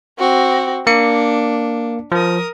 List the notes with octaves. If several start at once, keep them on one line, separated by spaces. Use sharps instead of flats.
C4 F#4
A#3 D4 C#7
F3 A#4 D#6